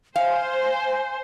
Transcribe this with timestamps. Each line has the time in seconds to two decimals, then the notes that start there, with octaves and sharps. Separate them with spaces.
0.16 C5 F5 G#5